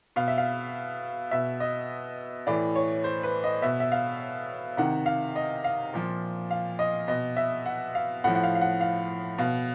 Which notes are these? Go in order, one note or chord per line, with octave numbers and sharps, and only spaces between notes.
B2 F5
E5
F5
B2 E5
D#5
A2 E3 D5
C#5
C5
B4
D#5
B2 E5
E5
F5
C3 D#3 F#5
F5
D#5
F5
A#2 F3
F5
D#5
B2 D#5
E5
F#5
F5
A2 F3 F#5
F#5
F5
F5
F#5
F5
B2 F5